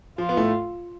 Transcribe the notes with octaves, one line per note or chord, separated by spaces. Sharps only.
F3 F4
B3
A2 A3